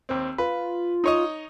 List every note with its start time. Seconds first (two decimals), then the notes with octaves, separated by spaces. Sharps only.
0.09 D#2 C4
0.38 F4 B4
1.04 D#4 C#5 D#5